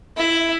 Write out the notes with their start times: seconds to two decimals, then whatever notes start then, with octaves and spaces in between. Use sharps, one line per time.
0.17 E4